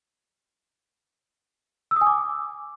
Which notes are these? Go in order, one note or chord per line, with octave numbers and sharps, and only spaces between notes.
E6
D#6
G#5
D6